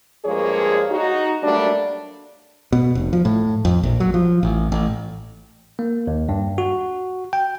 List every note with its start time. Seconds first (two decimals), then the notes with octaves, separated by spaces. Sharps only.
0.25 G2 F3 G#3 A#3 G#4 C#5
0.91 D#4 F#4
1.43 F#3 G3 A3 A#3 D4
2.72 B2
2.95 F1
3.13 F3
3.25 A2
3.65 F2
3.83 A#1
4.00 F#3
4.14 F3
4.43 A1
4.72 A1
5.79 A#3
6.07 D#2
6.29 G2
6.58 F#4
7.33 G5